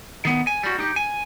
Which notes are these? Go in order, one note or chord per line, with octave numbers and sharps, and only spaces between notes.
D#3 B3
G#5
G3 F#4
D#4 G4
G#5